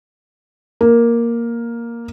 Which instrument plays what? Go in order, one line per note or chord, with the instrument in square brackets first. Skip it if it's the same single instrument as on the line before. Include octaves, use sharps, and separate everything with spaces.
[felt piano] A#3